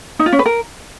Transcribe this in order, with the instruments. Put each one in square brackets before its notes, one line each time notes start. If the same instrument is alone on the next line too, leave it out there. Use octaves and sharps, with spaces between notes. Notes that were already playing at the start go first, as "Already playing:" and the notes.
[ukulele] D#4
F4
C#4
B4
A#4